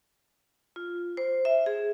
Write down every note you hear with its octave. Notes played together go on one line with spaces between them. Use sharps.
F4
C5
E5
G#4